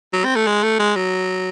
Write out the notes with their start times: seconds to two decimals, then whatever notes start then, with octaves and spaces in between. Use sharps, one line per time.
0.13 F#3
0.25 C4
0.35 A3
0.47 G#3
0.63 A3
0.79 G#3
0.96 F#3